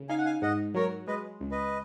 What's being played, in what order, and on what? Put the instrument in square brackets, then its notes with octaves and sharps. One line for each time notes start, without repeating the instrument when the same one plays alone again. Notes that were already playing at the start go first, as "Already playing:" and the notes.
Already playing: [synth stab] C#3
[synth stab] D#4 [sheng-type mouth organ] F5 G#5
[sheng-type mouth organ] F#5
F5 G#5
[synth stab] G#2 [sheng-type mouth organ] D#5 F#5
[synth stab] F#3 [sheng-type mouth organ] A#4 C#5
[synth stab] G#3 [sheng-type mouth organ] B4 D#5
[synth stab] C#2
[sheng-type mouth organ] B4 D#5